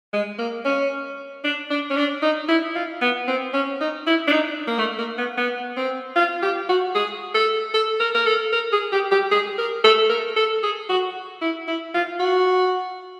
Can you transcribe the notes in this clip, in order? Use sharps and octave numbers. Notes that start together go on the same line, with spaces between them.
G#3
A#3
C#4
D4
D4
C#4
D4
D#4
E4
F4
B3
C4
C#4
D#4
E4
D4
D#4
A#3
A3
A#3
B3
B3
C4
F4
G4
F#4
G#4
A4
A4
A#4
A#4
A4
A#4
G#4
G4
G4
G#4
A#4
A4
A#4
A4
G#4
F#4
E4
E4
F4
F#4